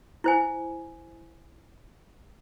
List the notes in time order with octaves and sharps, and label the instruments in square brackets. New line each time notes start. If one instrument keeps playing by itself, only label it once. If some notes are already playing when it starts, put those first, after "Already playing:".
[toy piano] E4 C5 G#5